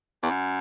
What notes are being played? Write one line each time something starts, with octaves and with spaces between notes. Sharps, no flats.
E2
F#2